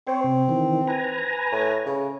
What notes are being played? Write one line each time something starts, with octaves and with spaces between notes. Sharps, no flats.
C4 C5 C#5
C3
D#3 E3
B4 G#5 A#5
A2
C#3